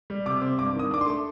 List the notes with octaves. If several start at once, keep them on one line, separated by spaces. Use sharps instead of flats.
G3
C3 D6
C4
G2 D6
D#3 D#6
D4 D6
C6
A3